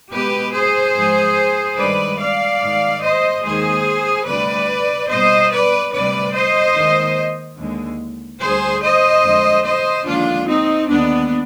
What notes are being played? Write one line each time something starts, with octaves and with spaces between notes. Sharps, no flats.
B2 G#3 G4 B4
G#4 C5
G#2 F3 G#3
G2 D#3 G#3 B4 D5
D5 F5
G#2 D#3 G#3
C5 D#5
D#2 D#3 G#3 G#4 C5
D2 C3 G3 B4 D5
B2 G3 C5 D#5
B4 D5
D2 C3 G3 B4 D5
C5 D#5
D#2 D#3 G#3
D#2 D3 G#3
D2 D3 G3 G#4 C5
C5 D#5
F2 D3 G#3
C5 D#5
D#2 D3 F3 G#3 D4 F4
C4 D#4
D#2 D3 G#3 B3 D4